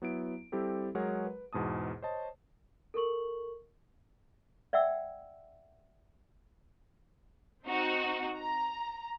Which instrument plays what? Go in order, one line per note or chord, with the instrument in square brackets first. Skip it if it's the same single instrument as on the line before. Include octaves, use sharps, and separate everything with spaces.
[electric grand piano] F#3 B3 E4 D7
G3 C4 E4 G4 A4
F#3 G#3 G#4 A#4 C#5 F#5
B4
E2 G#2 B2 A5 D#6
C5 C#5 D#5 A5
[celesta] A4 A#4 C#6 F#7
[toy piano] D5 E5 F#5 G5 E6
[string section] C4 D#4 F#4
A#5